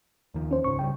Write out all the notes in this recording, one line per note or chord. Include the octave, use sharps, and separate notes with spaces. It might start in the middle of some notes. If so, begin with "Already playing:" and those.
D#2 D#3 F3
C#4 C5
C#2 G#2 C#3 C#6
C#3 E3 G3 G5